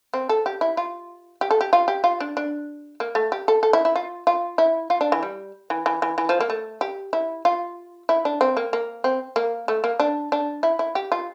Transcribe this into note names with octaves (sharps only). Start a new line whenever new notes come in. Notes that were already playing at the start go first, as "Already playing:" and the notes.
C4
A4
G4
E4
F4
G4
A4
G4
F4
G4
F4
D4
D4
A#3
A3
G4
A4
A4
E4
E4
F4
F4
E4
F4
D4
E3
G3
E3
E3
E3
E3
F3
A#3
A3
G4
E4
F4
E4
D4
C4
A#3
A#3
C4
A#3
A3
A#3
D4
D4
E4
E4
G4
F4